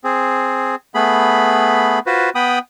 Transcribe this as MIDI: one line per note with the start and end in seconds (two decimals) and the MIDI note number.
0.04 0.75 60
0.04 0.75 68
0.95 1.99 57
0.95 1.99 59
0.95 1.99 68
0.95 1.99 83
2.06 2.30 65
2.06 2.30 66
2.06 2.30 71
2.06 2.30 72
2.35 2.59 59
2.35 2.59 79
2.35 2.59 83
2.35 2.59 87